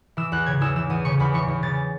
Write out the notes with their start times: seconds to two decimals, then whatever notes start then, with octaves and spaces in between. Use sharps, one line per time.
0.17 E3 E6
0.32 E2 F#6
0.46 C#3 G#6
0.61 E2 E6
0.76 E3 E6
0.90 E2 D#6
1.05 C#3 C#6
1.20 E2 B5
1.33 E3 C#6
1.48 E2
1.62 C#3 A6